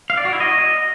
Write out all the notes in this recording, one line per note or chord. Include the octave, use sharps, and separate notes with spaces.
F5
D5
F#4
E4
D#5